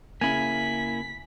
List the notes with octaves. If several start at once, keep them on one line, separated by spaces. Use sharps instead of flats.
C#3 A#3 E4 G#5 B6